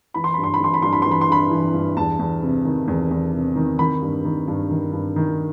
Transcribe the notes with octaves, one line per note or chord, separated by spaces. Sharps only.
E3 B5
C6
G2 B5
C6
B5
E3 C6
B5
G2 C6
B5
E3 C6
B5
C6
G2 B5
E3
G2
E2 A5
E2
C3
D#3
E2
E2
C3
D#3
D#3 B5
G2
D#3
G2
D#3
G2
D#3